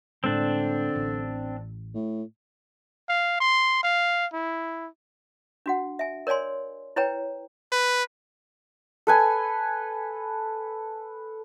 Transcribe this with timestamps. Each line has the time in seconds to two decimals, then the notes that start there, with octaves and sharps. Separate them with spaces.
0.24 A2 D3 G#3 C4 D4
0.96 A1
1.94 A2
3.09 F5
3.40 C6
3.83 F5
4.33 E4
5.66 D4 F#4 F#5
5.99 E5 G#5
6.27 A#4 C#5 D5 G#5 C6
6.96 E4 B4 C#5 G5 A#5
7.72 B4
9.07 A4 B4 G#5